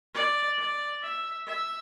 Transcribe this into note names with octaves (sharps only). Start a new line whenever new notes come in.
D5
D5
E5
E5